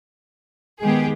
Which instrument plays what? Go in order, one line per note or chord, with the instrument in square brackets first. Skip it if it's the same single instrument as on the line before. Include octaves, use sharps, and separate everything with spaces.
[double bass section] D#3 G#3 [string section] B3 G4 G#4